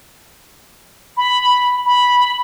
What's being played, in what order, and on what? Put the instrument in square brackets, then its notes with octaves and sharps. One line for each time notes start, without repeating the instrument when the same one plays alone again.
[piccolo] B5
B5